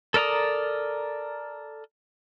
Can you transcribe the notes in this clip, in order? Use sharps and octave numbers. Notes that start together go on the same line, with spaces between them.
A4 A#4 D5 A#5 D#6